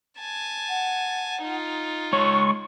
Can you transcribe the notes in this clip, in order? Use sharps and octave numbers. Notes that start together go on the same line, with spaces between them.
G#5 A5
F#5
D#4 F4
G#3 C#5 C6 C#6